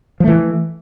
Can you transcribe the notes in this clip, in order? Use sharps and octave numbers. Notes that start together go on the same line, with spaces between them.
E3 F3 A3